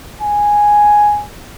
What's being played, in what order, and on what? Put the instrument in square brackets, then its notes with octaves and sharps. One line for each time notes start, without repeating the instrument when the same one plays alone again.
[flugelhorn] G#5